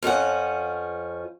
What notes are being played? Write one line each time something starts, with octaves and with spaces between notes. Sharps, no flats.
F2 F3 C#4 F#5